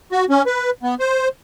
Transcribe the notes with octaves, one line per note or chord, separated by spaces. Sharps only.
F#4
C#4
B4
B3
C5